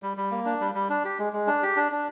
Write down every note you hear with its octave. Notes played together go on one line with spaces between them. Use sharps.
G3
G3
A#3
D4
G3
G3
D4
G4
G#3
G#3
D4
G4
D4
D4